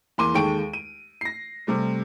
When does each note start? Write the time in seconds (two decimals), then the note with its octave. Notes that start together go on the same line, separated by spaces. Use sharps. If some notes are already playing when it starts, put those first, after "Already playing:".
0.18 E2 A#3 C6 D6 D#7
0.34 D#2 G#3 A4 G5 C#6 D7
0.73 D#7
1.21 A#6 C7
1.67 C3 G3 A3